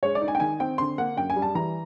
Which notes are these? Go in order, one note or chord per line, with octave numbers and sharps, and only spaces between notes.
G#3 C#5
D5
D#4
G#5
G5
D#3 G#5
C4 G5
D3 C6
A#3 F#5
F#2 G5
G#5
G3
A5
E3 A#5